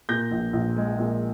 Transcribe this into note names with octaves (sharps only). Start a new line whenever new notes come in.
A#2 G6 A#6
A#1
A#1
G#3
A#2